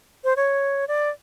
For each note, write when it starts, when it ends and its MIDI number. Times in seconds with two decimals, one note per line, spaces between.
0.24 0.33 72
0.36 0.85 73
0.88 1.09 74